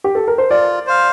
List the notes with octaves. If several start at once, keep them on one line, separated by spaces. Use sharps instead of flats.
G4
A4
A#4
C5
F4 D5
C5 F5